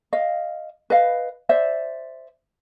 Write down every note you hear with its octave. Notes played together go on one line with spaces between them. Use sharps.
D#5 F5
B4 D#5 F5
C5 D5 E5